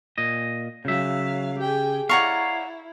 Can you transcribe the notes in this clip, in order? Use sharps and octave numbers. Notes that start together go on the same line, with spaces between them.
A#2 D#5
C#3 F#3 E5 F5
G4 G#4 G5
E4 C#5 D5 F5 F#5 A#5 C#6